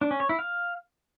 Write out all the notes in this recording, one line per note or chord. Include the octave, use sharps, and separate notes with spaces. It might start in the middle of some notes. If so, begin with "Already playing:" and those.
D4
C#4
C#5
E4
F5